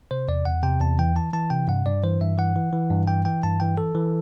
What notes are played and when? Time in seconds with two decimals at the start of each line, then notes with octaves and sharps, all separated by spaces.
0.11 C3 C5
0.28 E2 D5
0.45 E2 F#5
0.63 C3 G5
0.81 E2 A5
0.99 E3 G5
1.16 E3 A5
1.33 E3 A5
1.50 C3 G5
1.68 G2 F#5
1.86 G2 D5
2.04 E3 C5
2.21 G2 E5
2.38 E3 F#5
2.56 E3
2.73 E3
2.91 G2
3.07 E3 G5
3.25 E3 G5
3.43 G2 A5
3.60 E3 G5
3.77 E3 A4
3.95 E3